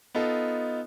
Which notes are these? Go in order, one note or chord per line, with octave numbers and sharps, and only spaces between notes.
B3 D#4 F4 A4